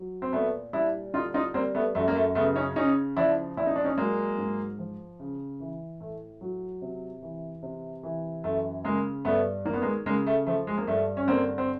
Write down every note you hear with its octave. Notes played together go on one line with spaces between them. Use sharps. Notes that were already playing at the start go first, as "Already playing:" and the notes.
Already playing: F#3
C4
A#2 A3 B3
G3 D4 E4
D3 D#4 F4
D#4 F4
G3 A#3 C4
A3 B3
F#2 A3
A#3
A3
C#3 A3 B3
C#4 D#4
C#3 C#4 D#4
F3 D4 E4
A#2 E4
D#4
D4
C#4 D#4
F#3 G#3 A#3
G#2
F3
C#3
E3
A2 A3
F#3
C3
E3
C3
E3
F#2 A3
C#3 G#3 A#3
G2 A3 B3
D#3 A#3
B3
G#3 A#3
C#3 G#3 A#3
A3
F3 A3
G#3
A#3
G2 A3
C#4
D3 A#3 C4
C4